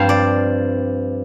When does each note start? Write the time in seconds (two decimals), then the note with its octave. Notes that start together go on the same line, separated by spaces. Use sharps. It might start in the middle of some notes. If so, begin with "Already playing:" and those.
Already playing: G2 F3 C4 F5
0.09 D5